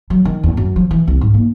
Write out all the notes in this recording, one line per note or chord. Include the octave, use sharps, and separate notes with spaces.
F#3
D#3
E2
F#2
F3
E3
C2
G#2
A#3